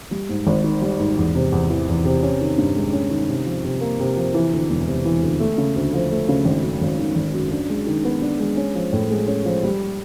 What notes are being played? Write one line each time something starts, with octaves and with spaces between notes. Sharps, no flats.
G3
G#2
G#1
D#3
G3
G#2
E2
C3
E2
E3
E2
C3
C#4
D#3
G2
G#3
C#4
D#3
C3
F3
C3
A#3
C3
F3
E3
D2
E1
C3
E3
D2
A3
C#3
D2
F3
A3
C#3
G#1
F#2
G#1
D#3
G#1
F#2
D4
G#3
D#3
B3
D4
G#3
C#4
F3
A2
G#3
C#4
F3
G3